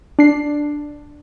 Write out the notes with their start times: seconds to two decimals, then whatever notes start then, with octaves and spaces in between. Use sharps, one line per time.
0.19 D4 C7